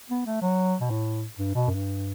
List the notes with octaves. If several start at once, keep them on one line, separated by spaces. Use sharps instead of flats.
B3
A3
F#3
B2
A2
G2
B2
F#2
G2